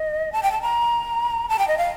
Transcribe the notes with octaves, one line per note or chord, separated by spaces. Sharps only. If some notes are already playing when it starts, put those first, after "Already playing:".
Already playing: D#5
A5
G5
A5
A#5
A5
G5
D#5
F5